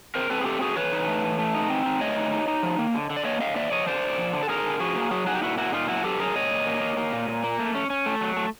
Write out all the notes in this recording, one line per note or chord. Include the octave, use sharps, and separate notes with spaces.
C4 A#4 C5
C4 A4 B4
G#4
A3 G4 A4
A3 F#4 G#4
E3 B4 C#5
D#4
A3
E3
A3
D#4
C4
D#4
A3 C#5 D#5
D#4
D#4
D#4
F3
A#3
D3
D3
D5
A#3 C#5 D#5
D3 D#5 F5
A#3 D5 E5
F3 C#5 D#5
D3 C5 D5
D3
F3
D3
A4
D3 G#4 A#4
D3
F3 F#4 G#4
A#3
F#3 F#4 G#4
D#4 F#4 G#4
G4
A#2 E4 F#4
A#3 E4 F#4
A#2 D#4 F4
F#3 E4 F#4
F#3 G4 A4
F#3 G#4 A#4
A#2 C#5 D#5
A#2
A#3
A#3
A#3
A#2
A#2
A#3
A3
C#4
C#4
A3
F#3
A3